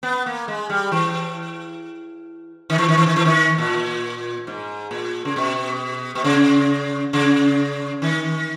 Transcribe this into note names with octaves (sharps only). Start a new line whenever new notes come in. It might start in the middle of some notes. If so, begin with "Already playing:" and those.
B3
A#3
G#3
G3
E3
D#3
E3
D#3
E3
D#3
E3
D#3
A#2
G#2
A#2
C#3
B2
B2
C#3
C#3
D#3